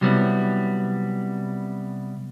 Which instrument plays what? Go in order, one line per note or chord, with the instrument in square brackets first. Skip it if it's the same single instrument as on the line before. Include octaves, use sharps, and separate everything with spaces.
[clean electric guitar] C3 F#3 G3 B3 C4 E4